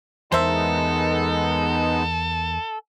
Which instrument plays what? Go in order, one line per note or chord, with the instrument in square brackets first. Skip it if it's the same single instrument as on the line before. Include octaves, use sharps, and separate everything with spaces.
[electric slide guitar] E2 A#4 [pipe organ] G#3 B3 D#4 [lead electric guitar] A4 [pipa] C5 E5